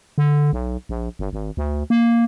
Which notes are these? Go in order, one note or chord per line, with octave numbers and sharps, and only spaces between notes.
D3
B1
A#1
G1
G#1
D2
A#3